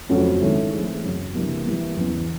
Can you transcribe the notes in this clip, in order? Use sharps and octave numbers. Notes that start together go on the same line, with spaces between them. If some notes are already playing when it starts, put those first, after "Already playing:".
F2 C#3 F#3 A3 C#4
D#3 G#3 C#4 E4 A4
E3 A3 C4 E4 G#4
F#2 C#3 F#3
C3 E3 G3 A#3 D4
E3 G3 A#3
E2 C#3 E3